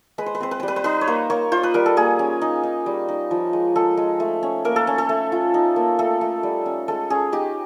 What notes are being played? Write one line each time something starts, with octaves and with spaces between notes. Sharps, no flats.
G#3 B4
C5
B4
C4 C5
B4
G3 C5
B4
C5
D#4 B4
C#5
A#3 C5
A#3 C#5
F4 C5
B4
G3 A#4
A4
A#3 G#4
C#4
D#4
D#4
G3
D#4
F3
G#3
G#3 A4
G#3
A3
C#4
A#3 A#4
A4
C#4
A4
A3
F4
D#4
A#3
A3 A4
A3
G3
C#4
G#3 A4
C#4 G#4
D#4 G4